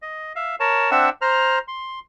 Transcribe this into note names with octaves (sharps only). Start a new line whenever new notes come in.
D#5
E5 F5
A#4 C#5 A5
C4 D4 E5 F#5 E6
C5 A#5 F6
C6